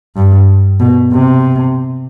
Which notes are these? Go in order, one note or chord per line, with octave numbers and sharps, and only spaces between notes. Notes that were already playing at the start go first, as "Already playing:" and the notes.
G2
B2
C3